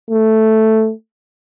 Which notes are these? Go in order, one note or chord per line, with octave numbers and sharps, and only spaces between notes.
A3